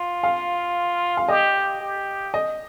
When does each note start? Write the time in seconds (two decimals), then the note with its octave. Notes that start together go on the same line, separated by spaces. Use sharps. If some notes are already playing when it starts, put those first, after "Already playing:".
Already playing: F4
0.23 F5
1.17 F5
1.28 G4 D#5
1.81 G4
2.34 D#5